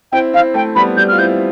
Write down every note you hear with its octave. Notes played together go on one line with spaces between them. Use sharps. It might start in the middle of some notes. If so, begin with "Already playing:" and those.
C4 E4 G5
C4 E4 F5
A3 C4 G5
G3 B3 B5
G3 G6
F4 F6
C4 E4 G6